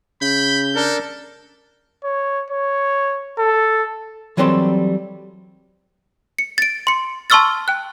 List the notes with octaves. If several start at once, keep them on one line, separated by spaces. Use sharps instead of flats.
C#3 B5 G6
D4 A4 A#4
C#5
C#5
A4
E3 F#3 G3 C4 A4 C6
C#7
A6 D7
C6 C#7
A5 C6 C#6 E6 F6 A6
G5 F#6